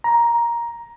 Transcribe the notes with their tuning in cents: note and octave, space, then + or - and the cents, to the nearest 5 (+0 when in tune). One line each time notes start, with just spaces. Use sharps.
A#5 +10